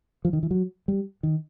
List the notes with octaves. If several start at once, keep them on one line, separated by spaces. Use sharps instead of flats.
F3
D#3
E3
F#3
G3
D#3